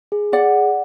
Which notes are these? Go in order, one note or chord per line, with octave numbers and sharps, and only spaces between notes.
G#4
G#4 D5 F#5